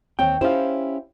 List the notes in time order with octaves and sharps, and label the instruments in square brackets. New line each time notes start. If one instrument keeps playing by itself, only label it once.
[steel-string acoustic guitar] D#2 C4 C#5 [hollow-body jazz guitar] G5
[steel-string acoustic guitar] C#4 E4 G4 [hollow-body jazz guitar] C5 F5